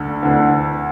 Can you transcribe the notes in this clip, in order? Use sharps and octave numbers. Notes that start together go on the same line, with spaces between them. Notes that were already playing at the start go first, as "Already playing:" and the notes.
Already playing: D2 D3
D2 D3